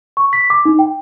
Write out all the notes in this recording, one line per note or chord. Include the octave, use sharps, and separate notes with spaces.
C#6
B6
D6
D#4
G5